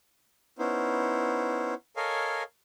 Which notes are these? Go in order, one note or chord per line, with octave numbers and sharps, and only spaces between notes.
B3 C#4 D#4 E4 C5
A4 A#4 C#5 D#5 F5 G#5